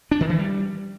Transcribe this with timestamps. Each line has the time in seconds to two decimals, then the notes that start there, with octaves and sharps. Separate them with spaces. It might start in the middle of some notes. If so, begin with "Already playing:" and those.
0.11 D4
0.21 D#3
0.30 E3
0.39 G3